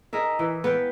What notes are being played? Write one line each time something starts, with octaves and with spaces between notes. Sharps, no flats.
D#4 G#4 A#4 E5
E3
B3 B4 F5 G5